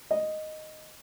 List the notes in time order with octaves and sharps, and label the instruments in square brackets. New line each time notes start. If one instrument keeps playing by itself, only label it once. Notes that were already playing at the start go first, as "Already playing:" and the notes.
[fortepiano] D#5